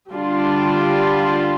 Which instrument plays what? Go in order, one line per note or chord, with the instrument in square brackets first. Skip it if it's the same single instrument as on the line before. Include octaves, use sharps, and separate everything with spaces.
[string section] D3 G3 D4 F4